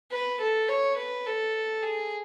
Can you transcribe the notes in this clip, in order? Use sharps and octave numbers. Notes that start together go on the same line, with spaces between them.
B4
A4
C#5
B4
A4
G#4